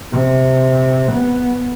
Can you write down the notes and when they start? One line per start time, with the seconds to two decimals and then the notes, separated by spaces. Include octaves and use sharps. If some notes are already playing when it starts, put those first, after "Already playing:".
0.12 C3
1.12 B3